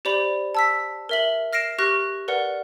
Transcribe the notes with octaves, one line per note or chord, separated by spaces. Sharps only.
G4 C5 D5 B5 F7
A5 E6 B6
A#4 E5 F#7
F6 A#6 C7 D7 E7
G4 C#6 F6 F#6 A#6
A#4 B4 D5 F#5